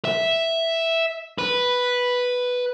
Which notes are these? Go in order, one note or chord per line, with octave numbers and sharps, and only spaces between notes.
E5
B4